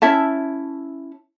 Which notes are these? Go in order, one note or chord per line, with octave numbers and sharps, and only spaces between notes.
C#4 E4 E5 A5